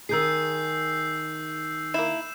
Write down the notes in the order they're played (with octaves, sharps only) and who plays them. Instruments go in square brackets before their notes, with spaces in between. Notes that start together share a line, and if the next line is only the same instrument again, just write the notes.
[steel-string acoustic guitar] D#3 G#4 [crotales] E6 G6 C7
[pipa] A#3 E4 [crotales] E7